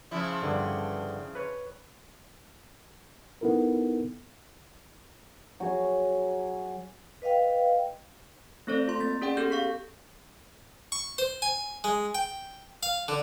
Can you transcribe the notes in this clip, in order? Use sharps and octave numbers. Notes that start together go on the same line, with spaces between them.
C#3 F3 E4
G2 D3
B4 C#5
B3 D#4 E4 A4 A#4
F#3 G#4
B4 D#5 F5 G5
A3 C4 A4 C5 D5
F4 C6
A#3 A6
C#4 G#4 D5 F#5 G5
B3 G4 A4 G6
F5 C#6 B6
C#6
C5
G#5
G#3
G5
F5
D3